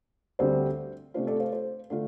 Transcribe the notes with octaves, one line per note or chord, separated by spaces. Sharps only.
D2 D3 G3 C4 C5
C3 A3 D4 F4 C5
A4 D5
C5 F5
C5
D3 A3 F4 A4